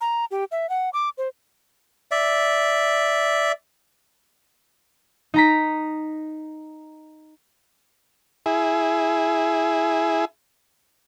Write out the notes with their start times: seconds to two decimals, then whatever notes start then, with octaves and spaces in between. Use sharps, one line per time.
0.01 A#5
0.31 G4
0.51 E5
0.69 F#5
0.93 D6
1.18 C5
2.11 D5 E5
5.34 D#4 A#5 B6
8.46 E4 G#4